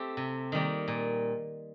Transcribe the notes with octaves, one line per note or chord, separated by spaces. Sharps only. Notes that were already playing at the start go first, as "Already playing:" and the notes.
Already playing: A3 C4 G4
C3
D#3 G3 A#3
A#2